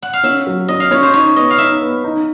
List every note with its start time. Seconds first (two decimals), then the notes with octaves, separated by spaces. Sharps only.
0.03 F#5
0.13 F5
0.24 C#4 E5
0.47 F#3
0.68 C#4 D#5
0.80 F5
0.91 C#4 C#5
1.03 C5
1.14 D#4 C#5
1.36 B3 D#5
1.50 F5
1.58 D#4 E5
1.82 B3
2.04 D#4